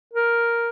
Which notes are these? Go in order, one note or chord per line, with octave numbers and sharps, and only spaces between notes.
A#4